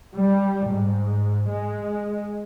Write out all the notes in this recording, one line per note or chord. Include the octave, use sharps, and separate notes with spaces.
G3
G#2
G#3